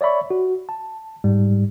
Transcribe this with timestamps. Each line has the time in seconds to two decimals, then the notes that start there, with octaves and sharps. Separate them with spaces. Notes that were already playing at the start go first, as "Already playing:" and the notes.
0.01 C#5 D5 E5 B5 C#6
0.31 F#4
0.69 A5
1.24 G#2 G3